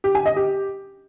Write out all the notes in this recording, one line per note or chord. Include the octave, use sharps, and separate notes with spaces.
G4
G#5
D#5
G4